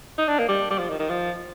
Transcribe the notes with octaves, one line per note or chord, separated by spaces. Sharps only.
D#4
D4
A#3
G3
G3
F3
D#3
D#3
F3